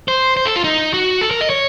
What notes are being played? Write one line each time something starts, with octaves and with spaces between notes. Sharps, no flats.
C5
C5
A4
F4
D#4
F#4
A4
A#4
D#5
C#5